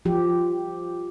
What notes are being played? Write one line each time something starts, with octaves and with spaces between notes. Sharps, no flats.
F3 G4